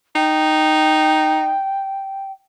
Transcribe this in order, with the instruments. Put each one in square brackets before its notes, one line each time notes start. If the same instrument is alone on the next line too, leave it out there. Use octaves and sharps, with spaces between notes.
[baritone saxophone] D#4 [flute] G5